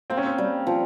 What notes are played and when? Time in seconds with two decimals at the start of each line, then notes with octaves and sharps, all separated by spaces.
0.10 A#3 C4
0.17 C#4
0.25 C4
0.38 G3
0.67 F3